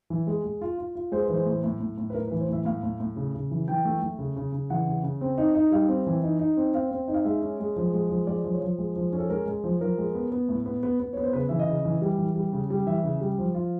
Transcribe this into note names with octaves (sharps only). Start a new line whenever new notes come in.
E3
G#3
G#3
F4
F4
F4
G#3 C5
B4
E3 C5
A2
A2
A2
A2
B4
A2 A#4
B4
E3
C5
A2 E5
A2 F5
A2
A2
C#3
C#3
E3
E3 G5
A3
A3
C#3
C#3
C#3
E3 F#5
C#3
C#3
C4
D#4
D#4
G3 F5
C4
E3
D#4
D#4
C4
C4 F5
C4
D#4
F5
G#3 E5
C#4
G#3
F3
G#3
F3
G#3 D5
F3
C#5
F3
G#3
F3
C#4
A4
G#3 A#4
G#3
F3
F3 A#4
G#3
B3
B3
A2
B3
B3
B3
B3 C#5
C5
C#3 B4
E3 E5
D#5
C#3
E3
G3
E3
G3
C#3
G3
E3 E5
C#3
G3
F3
F4